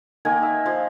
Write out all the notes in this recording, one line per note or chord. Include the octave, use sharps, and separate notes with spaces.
D#3 A#3 G#5
E5
F3